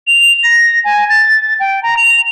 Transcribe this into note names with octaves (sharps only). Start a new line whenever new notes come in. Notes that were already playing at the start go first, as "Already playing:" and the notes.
F7
A#6
G#5
A6
G5
A#5
F7